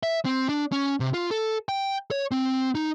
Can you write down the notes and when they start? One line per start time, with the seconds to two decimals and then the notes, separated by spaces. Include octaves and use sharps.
0.03 E5
0.25 C4
0.49 D4
0.72 C#4
1.00 C3
1.14 F4
1.31 A4
1.69 G5
2.11 C#5
2.31 C4
2.75 D#4